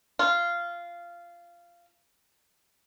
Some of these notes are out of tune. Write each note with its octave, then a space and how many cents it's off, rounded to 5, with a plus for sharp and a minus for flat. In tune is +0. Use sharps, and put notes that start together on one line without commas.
F4 -15